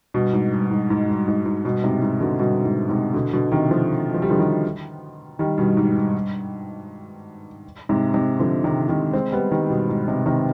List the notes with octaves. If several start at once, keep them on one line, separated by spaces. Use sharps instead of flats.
G2 B2
G#2
G2
G#2
G#2
G2
G#2
G#2
G2 B2
G#2 C3
G#2
B2 D3
G2 B2
G#2
G#2 C3
B2 D3
B2 D3
C3 D#3
D3 F3
F3
G3
D3 F3
D#3 G3
D#3 G3
G2 B2
G#2
G2
G#2 C3
G#2 C3
D3 F3
C3 D#3
C3 D#3
G#3 C4
G3 B3
D#3 G3
G2 B2
G#2
G#2 C3
C3 D#3